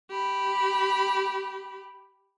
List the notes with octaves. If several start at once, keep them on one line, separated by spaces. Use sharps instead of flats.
G4 B5